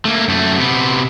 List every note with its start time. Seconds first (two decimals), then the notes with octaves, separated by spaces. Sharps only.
0.05 A3 A#3
0.28 F#2 A3
0.58 C3 B3